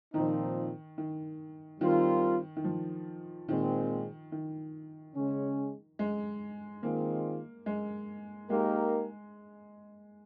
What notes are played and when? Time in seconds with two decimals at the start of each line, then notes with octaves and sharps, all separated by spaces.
0.14 A#2 D#3 F3 C4 D#4
0.98 D#3
1.81 D#3 G3 C4 F4 A#4
2.56 D#3
2.64 F3
3.49 A#2 D#3 G#3 C4
4.32 D#3
5.16 C#3 G#3 C#4
5.99 G#3
6.83 D#3 G#3 A#3 C4 F4 G#4
7.66 G#3
8.50 G#3 A#3 D#4 G4 A#4